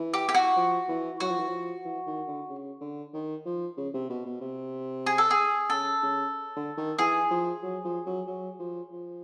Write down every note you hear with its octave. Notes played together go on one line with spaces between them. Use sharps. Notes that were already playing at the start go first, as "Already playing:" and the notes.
Already playing: E3
G4
G4
F#4
F3
E3
F#3 F#4
F3
E3
F3
E3
D#3
D3
C#3
D3
D#3
F3
C#3
C3
B2
B2
C3
G#4
A4
G#4
C#3 A4
C#3
D3
D#3
E3 G#4
F3
F#3
F3
F#3
F#3
F3
F3